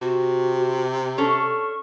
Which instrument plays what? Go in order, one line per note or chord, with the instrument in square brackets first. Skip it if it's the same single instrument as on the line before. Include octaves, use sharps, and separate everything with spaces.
[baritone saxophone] C3 [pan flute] F#4
[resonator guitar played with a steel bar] C#4 D4 A4 [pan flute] C#6